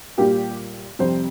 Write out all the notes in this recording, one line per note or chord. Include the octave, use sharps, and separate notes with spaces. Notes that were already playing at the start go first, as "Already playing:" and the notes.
A#2 G3 A#3 G4
F2 C3 G3 C5